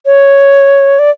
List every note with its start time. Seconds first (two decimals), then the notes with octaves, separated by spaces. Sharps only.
0.06 C#5
0.99 D5